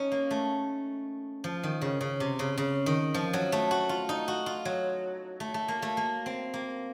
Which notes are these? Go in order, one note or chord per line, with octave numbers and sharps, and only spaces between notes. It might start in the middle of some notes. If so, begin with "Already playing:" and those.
Already playing: C#4 D#4
A#3
A3
F3
D#3
C#3
C#3
C3
C#3
C#3
D#3
F3
F#3
A3
F#4
F4
D#4
F#4
F4
F#3
A3
A3
A#3
A3
A#3
C4
A#3